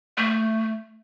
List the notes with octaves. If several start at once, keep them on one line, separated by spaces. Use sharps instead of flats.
A3